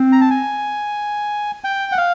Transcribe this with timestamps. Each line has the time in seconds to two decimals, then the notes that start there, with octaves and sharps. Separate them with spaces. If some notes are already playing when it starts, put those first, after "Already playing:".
Already playing: C4
0.12 A#5
0.21 A5
0.30 G#5
1.64 G5
1.92 F#5
1.98 F5